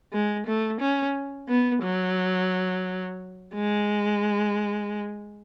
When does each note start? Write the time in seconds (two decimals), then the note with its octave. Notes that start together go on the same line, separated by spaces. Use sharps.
0.13 G#3
0.46 A3
0.81 C#4
1.48 B3
1.83 F#3
3.54 G#3